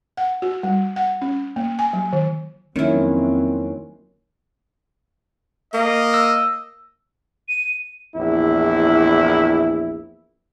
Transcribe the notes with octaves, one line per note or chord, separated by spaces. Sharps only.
F#5
F#4
G3
F#5
C#4
A#3
G#5
F#3
D#3
F2 D#3 F#3 A#3 C4 C#4 E4
A#3 D#5
E6
D#7
A#1 E2 E4